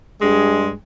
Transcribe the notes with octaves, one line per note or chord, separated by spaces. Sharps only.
G2 G#3